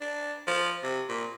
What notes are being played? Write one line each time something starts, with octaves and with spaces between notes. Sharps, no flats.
D4
F3
C3
A#2